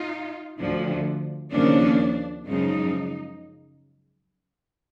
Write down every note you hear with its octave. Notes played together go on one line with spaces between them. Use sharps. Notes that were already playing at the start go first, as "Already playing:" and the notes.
Already playing: D#4 F4
D2 D3 F3
D#2 C#3 F3 A#3 C#4 D4
F#2 C#3 F3 G#3 D#4